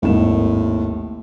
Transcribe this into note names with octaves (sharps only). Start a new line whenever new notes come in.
G#1 D#2 A2 E7